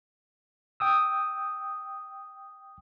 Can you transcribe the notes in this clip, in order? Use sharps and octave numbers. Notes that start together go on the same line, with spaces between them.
G5 D#6 E6